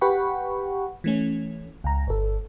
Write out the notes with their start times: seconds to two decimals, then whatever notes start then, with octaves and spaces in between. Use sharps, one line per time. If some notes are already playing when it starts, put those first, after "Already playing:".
0.01 G4 B4 F#5 G5 B5 C#6
1.04 E3 A3 C#4
1.84 C#2 A#5
2.07 G1 A4